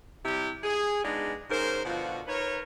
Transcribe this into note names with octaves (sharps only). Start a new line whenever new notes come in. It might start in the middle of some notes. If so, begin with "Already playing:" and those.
C3 G3 E4 G4
G#4
G#3 B3 D4 D#4 F4
G#2 C#4 A#4 C5
B2 D3 F3 F4 F#4
D#4 A#4 B4 C#5